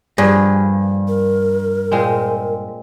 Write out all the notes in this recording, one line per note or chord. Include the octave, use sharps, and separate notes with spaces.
G2 F3 A#3 G#4
A#4
A#2 G#3 C4